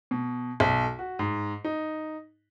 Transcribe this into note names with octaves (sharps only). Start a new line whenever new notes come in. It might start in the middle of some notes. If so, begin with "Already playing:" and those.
B2
B1
F#4
G#2
D#4